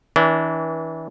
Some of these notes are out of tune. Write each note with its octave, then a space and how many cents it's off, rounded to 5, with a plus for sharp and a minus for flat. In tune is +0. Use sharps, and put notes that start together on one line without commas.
E3 -30 D4 -40